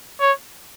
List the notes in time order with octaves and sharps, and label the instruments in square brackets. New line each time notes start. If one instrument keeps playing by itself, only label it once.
[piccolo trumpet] C#5